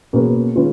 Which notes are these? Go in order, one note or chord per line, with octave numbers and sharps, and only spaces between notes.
B2 A#3 C#4 G#4 B4
D#3 G#3 C#4 F4 B4